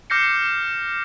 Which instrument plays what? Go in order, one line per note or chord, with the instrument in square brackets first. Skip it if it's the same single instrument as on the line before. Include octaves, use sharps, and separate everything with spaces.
[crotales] D6 F6 G6 A#6 C7 C#7